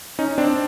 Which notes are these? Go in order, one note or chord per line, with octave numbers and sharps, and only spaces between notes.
C#4 D#4
C4 D4